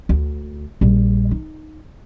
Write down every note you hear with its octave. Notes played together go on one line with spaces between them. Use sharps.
D2
A#1 G3
D#4